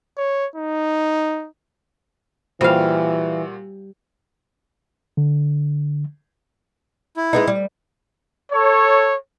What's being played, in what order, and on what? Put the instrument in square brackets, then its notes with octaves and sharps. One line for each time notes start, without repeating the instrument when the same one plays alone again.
[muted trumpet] C#5
D#4
[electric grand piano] A#2 F4 F#4 [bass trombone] E3 [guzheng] G3 F5 [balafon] C5
[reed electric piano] D3
[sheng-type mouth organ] E4
[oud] G#3 B3 D#4
G3
[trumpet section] A4 C#5